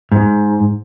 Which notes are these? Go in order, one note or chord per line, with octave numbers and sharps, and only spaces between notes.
G#2